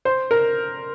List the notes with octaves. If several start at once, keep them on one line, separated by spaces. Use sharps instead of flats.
C5
A#4